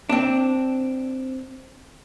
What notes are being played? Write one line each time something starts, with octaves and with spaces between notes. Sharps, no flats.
C4 D4